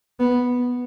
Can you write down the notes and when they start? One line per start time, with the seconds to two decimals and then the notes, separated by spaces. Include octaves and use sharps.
0.20 B3